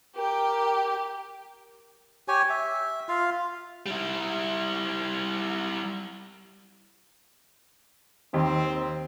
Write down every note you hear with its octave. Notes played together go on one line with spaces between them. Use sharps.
G4 A#4 G5
G4 C#5 G#5
E5
F4 F5
G3 E4
D#2 C4